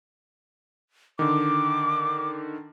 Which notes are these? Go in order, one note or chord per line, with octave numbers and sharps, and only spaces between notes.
D3 D#3 D6